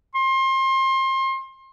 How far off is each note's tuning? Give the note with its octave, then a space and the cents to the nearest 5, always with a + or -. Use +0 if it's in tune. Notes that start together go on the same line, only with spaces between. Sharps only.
C6 +30